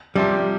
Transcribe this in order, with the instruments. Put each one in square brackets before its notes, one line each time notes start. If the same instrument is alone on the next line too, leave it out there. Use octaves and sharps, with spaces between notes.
[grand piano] C3 F3 C4 [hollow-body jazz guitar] G3